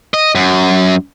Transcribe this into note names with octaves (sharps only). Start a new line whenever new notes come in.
D#5
F#2